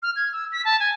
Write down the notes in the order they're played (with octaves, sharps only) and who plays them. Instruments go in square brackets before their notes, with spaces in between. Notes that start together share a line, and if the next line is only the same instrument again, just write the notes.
[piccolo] F6
G#6
E6
B6
A5
G#5